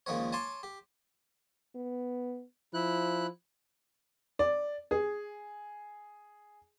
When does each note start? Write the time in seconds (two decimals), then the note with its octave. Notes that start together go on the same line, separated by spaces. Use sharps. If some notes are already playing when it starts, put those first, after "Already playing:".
0.06 C#2 A#2 D#3 F3 C#5
0.32 C#5 G#5 A5 C6 D6
0.63 G4
1.76 B3
2.74 F3 E4 F#6
4.39 D5
4.91 G#4